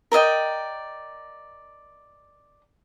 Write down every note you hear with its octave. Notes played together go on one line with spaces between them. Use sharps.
A#4 D5 D#5 G5